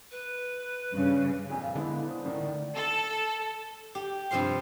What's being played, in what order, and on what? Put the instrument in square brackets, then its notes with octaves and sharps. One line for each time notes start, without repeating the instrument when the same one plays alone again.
[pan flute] B4
[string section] G2 C#3
[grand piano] A#1 F2 [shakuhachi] G#5
[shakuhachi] F5
[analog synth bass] D3 [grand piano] G#3 B3 [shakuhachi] E4
[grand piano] C5 D#6
[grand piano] C#2 A2 D#3 [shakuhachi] D5
[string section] A4
[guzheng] G4
G2 C3 F3 F5 C6